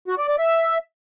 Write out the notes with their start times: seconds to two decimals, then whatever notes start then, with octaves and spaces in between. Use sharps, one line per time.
0.08 F#4
0.18 D5
0.28 D5
0.39 E5